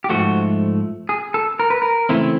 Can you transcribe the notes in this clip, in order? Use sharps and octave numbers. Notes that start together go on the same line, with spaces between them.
G4
G#2 F3 A3 F#4
G#4
A4
A#4
B4
A#4
C#3 E3 A3 C4 E4